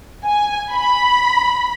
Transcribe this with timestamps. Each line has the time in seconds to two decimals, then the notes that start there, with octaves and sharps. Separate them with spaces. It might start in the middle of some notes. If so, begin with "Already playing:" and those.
0.24 G#5
0.73 B5